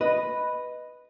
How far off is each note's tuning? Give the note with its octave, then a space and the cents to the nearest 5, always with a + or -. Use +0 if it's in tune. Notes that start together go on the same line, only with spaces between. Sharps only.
B4 +0 D#5 +0